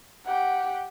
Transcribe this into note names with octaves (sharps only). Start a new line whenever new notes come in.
G4 F#5